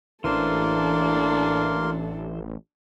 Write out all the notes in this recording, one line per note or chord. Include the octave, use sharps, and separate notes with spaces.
A1 E3 A#3 D4 A4 A#4 C5 C6